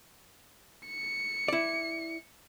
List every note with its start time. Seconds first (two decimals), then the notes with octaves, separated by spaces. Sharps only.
0.88 C#7
1.48 E4 D5